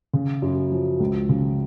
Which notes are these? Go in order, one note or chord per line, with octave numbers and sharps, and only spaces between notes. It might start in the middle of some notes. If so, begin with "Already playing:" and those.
C#3
F#2
F3
C#2
C#3